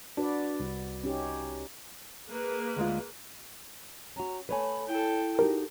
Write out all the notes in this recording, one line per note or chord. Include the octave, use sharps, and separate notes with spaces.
D4 F#4 B4 D5
C2
C#4 D#4 G4
A#3 G#4 B4
D2 G#3 F4
C#4 F#4 A#5
A3 B4 C#5 G#5 B5
E4 A4 G5
D#4 F#4 G4 A#4